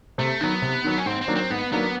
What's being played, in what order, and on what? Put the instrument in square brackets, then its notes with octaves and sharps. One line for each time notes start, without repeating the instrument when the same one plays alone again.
[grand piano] C3 [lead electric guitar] A3
[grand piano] D#3 F#3 [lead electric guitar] B3
[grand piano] C3
D#3 F#3
[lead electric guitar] C#4
[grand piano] G#2 [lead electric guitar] C4
[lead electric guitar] C4
[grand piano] D#3 F#3 A#3 D4
[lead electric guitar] C4
[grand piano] G#2 [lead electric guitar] B3
[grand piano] D#3 F#3 A#3 D4 [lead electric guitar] B3